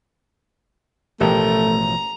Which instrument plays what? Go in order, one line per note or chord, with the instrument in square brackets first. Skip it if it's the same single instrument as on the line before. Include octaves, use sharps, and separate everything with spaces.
[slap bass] A1 B2 F3 [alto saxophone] A3 [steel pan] G4 A4 A#4 [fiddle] A#5